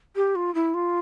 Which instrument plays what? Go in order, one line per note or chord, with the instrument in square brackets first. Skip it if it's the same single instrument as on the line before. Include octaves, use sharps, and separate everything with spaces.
[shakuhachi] G4
F4
E4
F4